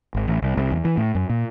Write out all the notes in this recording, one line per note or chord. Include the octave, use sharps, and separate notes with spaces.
G#1
A1
C2
C2
E2
E3
A2
F#2
A#2